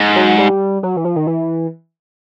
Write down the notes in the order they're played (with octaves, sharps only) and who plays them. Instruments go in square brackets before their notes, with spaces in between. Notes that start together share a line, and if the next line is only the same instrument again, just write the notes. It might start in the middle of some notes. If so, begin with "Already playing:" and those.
Already playing: [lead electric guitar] G#2
[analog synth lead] F#3
G3
F#3
E3
F3
D#3
E3